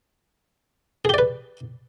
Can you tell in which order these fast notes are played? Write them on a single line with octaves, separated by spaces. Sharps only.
G#4 G4 D5 B4